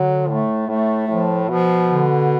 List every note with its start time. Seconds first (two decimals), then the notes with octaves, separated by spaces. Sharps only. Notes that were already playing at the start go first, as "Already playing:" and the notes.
Already playing: D3 F#3
0.28 A2 A3
0.68 A2 A3
1.08 A2 F3
1.48 B2 F3
1.89 D3